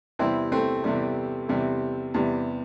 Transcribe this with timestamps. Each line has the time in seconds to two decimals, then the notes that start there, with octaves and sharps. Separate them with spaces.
0.19 E2 C3 G3 C4 E4
0.52 A3 C4
0.84 E2 C3 G3
1.49 E2 C3 G3
2.14 E2 C3 G3